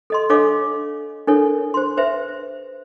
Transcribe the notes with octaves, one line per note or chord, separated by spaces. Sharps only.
A4 D#5 C6
D4 A4 C#5 D#5 F5 D6
D4 E4 A4 A#4 C#5
C5 C6
B4 C5 E5